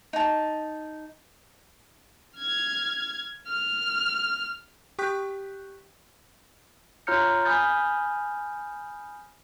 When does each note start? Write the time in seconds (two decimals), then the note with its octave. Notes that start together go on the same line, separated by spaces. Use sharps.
0.13 D#4 A5
2.38 F6 G#6
3.47 F6
4.99 G4 G5 C#6 F#6 G6 B6
7.07 F4 C#5 A#5 F6 G6 C#7
7.45 G#5 B5 D#6 F6 G6 A6